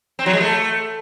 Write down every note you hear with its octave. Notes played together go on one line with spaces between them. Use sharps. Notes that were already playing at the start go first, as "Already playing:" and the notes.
C4
F#3
G#3
A3